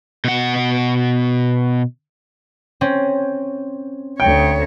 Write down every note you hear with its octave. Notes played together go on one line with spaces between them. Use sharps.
B2 F#5
C4 C#4
D2 C#5 G5